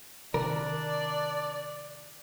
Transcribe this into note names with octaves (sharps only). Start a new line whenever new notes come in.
C3 D#3 D4 A#4 D5